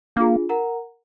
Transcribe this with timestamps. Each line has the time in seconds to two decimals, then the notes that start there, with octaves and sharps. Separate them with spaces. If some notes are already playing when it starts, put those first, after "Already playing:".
0.16 A#3 D4 F4 G#4
0.49 A#4 F#5 A#5